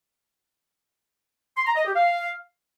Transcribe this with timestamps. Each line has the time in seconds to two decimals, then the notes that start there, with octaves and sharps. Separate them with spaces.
1.57 C6
1.66 A#5
1.76 D#5
1.86 G4
1.95 F5